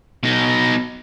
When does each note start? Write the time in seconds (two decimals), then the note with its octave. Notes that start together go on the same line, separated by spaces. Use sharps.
0.23 B2 D#4